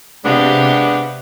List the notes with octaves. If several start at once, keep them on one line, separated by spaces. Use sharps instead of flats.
C3 G#3 B3 D4 G4 F5